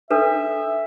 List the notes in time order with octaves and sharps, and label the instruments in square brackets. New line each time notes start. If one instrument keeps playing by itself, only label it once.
[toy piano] D4 A4 B4 [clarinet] E5